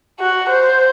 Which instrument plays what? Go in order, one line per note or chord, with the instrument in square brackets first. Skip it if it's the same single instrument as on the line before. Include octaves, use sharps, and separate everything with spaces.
[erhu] F#4
C5